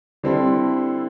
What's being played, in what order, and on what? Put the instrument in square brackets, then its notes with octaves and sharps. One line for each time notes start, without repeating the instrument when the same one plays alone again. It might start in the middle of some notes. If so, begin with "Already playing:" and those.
[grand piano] D3 G3 C4 E4 A4